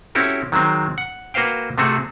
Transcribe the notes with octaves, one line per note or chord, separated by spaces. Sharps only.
C4 C#4 E4 F#4 G4 A4
D#3 F#3 G#3 C4
F#5
A#3 F#4 B4 C5 F5 G5
C3 A3 C4 F#4 G#4 A4